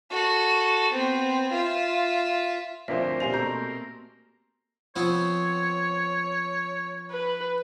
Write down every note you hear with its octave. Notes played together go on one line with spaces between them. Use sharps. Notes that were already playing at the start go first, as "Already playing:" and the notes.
F#4 A4
B3 C4
F4 E5
D2 A#2 F3 A#3 C4 D4 C5 E5
A#2 G4 C5 G#5 C7 F7
B2 A3 A#5 G6
F3 B3 C4 C#5
B4